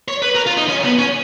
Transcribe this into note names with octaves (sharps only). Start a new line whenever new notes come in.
C#5
B4
A#4
F4
D#4
C#4
B3
C#4